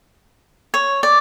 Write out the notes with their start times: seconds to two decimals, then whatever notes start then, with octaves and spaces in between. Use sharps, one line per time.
0.74 C#5
1.03 D5